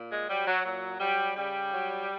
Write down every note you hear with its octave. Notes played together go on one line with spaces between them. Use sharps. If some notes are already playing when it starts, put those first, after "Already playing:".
Already playing: A#2
G#3
F#3 G3
F#3
A#2 F#3
F#3 G3
C#3 G3
F#3